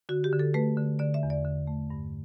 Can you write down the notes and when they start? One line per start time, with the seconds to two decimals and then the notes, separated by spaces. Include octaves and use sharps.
0.09 D3 F#4
0.24 G4
0.32 D3
0.39 A4
0.54 A3 B4
0.77 D3
0.99 D3 D5
1.14 E5
1.23 E2
1.30 D5
1.45 D3
1.67 A3
1.90 G2